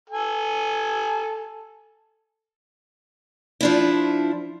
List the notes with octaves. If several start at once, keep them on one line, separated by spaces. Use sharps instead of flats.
A4 G#5
F3 D4 E4